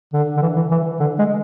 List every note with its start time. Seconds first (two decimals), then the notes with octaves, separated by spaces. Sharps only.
0.13 D3
0.37 D3
0.42 E3
0.56 E3
0.71 E3
1.00 D3
1.19 G#3